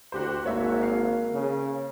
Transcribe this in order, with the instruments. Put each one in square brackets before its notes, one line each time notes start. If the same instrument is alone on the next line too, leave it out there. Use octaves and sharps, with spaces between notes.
[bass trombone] D2 [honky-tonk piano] F#4 G4 C5
[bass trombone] G#1 [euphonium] A#3 [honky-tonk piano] F#4 C#5 E5
[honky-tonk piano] F5
[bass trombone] C#3